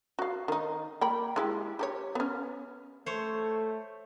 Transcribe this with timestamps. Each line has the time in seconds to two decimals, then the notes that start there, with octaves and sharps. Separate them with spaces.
0.19 F#4 F5
0.48 D#3 D#4
1.01 A#3 G5 B5
1.36 G#3 E4 G4
1.79 G4 A4 C#5
2.15 B3 C#4
3.06 A3 A4 C5 C#5